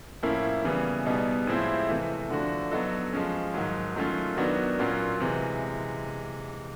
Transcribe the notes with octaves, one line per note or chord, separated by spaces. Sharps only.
A2 F3 A#3 C#4 E4
C#3 E3 G3 B3
B2 G3 B3 D#4 G#4
A2 F3 G#3 C4 E4
C3 E3 A3
D3 F3 A3 D4 F#4
F#3 B3 D#4 F#4 A4
F3 G#3 C#4
G#2 D#3 F#3
D#3 F#3 A3 C#4 F4
D#3 F#3 B3 D4 F#4
A#2 F#3 A#3 C#4 F4
C3 E3 G#3